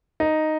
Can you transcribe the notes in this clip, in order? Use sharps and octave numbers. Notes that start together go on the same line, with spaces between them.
D#4